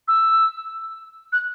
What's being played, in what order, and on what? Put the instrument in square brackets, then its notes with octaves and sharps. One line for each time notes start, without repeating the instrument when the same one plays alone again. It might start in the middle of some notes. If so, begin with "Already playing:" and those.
[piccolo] E6
F#6